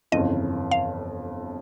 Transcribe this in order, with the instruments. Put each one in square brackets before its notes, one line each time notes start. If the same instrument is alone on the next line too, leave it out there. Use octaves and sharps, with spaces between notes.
[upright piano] G1 F2 C#3 E3 [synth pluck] D#5
[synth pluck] F5